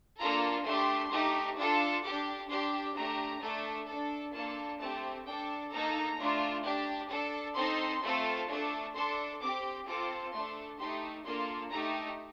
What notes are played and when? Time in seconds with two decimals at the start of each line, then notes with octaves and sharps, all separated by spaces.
0.19 A#3 D4 F4 A4 A#5
0.65 A3 D4 G4 C6
1.12 A3 D#4 G4
1.58 D4 F4 A4
2.03 D4 G4 D6
2.49 D4 G4 C6
2.96 A3 D4 G4 A#5
3.41 A3 D4 A4
3.88 D4 A4
4.34 A#3 D4 F4 A4 A5
4.80 A3 C4 G4 A5
5.26 D4 A4 G5
5.72 A#3 D#4 A4 A#5
6.18 A3 D4 F4
6.64 D4 G4
7.10 D4 A4
7.56 C4 D#4 A4 C6
8.03 A3 C4 F4 A4
8.49 A3 D4 A4
8.95 D4 A4 C6
9.41 C4 G4 D6
9.87 C4 F4 A4 D6
10.33 A3 D4 A4 C6
10.79 A3 D#4 G4 C6
11.25 A#3 D4 F4 A4 C6
11.71 A3 D#4 G4 A#5